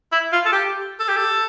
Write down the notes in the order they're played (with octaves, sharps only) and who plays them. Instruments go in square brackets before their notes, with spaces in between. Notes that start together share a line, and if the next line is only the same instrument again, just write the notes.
[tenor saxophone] E4
F4
A4
G4
A4
G4
A4